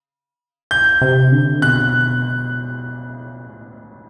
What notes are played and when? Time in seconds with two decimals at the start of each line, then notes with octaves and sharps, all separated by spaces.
0.71 G6
1.02 C3
1.32 D3
1.62 B2 F#6
3.46 A2